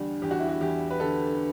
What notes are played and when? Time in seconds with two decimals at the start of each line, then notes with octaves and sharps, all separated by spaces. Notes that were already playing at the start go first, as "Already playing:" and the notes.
Already playing: E2 D3 G3
0.22 E2 G4
0.31 F#4
0.40 E4
0.49 F#4
0.61 E2 G4
0.90 B4
1.00 D3 A4